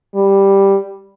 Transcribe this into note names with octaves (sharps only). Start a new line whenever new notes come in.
G3